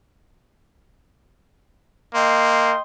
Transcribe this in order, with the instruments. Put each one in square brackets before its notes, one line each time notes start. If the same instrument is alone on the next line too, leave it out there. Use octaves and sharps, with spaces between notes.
[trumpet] A#3 [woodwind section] D#5 G5 C6